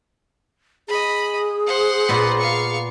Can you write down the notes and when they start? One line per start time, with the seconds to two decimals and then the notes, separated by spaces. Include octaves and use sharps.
0.88 G#4 D#5 B5
1.66 C5 F#5
2.09 A#2 B3
2.38 F5 C#6